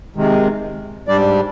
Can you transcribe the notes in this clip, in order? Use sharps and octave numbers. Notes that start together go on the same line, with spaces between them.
C3 D#3 G#3
G#2 G3 D4 D5